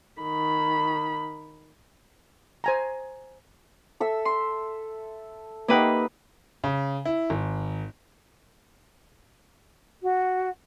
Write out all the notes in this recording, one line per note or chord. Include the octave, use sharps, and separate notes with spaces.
D#3 B5
C5 G#5 A#5
A4 E5 E6
C6
A#3 D#4 G4 B4 E5 F#5
C#3
E4
G#1
F#4